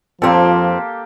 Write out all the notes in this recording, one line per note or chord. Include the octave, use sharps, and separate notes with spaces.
F2 F3 A#3 C4 G4 A4